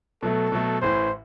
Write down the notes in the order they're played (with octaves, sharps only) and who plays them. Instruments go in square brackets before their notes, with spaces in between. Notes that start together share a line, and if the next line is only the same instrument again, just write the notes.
[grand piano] B2 F#3 A3 [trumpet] A4
[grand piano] B2 F#3 A3
[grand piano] A1 A2 E3 [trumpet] C5